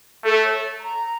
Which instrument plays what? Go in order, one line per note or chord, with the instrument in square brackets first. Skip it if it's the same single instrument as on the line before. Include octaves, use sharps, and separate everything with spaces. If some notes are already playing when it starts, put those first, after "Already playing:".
[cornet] A3 [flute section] A4
[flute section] C#5
A#5